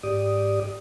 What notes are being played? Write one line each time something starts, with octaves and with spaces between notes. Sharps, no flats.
G#2 G4 D5 D#6